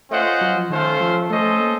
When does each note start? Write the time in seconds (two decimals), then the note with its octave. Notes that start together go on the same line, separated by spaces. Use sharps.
0.11 A3 C#4 F4 C5 D#5 F#5
0.41 F#3
0.55 F3
0.70 D#3 A3 C#4 A4 C5 F5
1.01 F3
1.30 A3 C#4 A4 C5 D#5
1.60 A#3